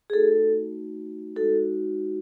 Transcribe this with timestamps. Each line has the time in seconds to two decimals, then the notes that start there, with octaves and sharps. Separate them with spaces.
0.10 G#4
0.13 A3 D#4 F#4 A4
1.36 G#3 D#4 F#4 A4